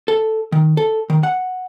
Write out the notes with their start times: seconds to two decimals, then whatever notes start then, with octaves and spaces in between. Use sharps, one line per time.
0.08 A4
0.52 D#3
0.77 A4
1.10 D#3
1.23 F#5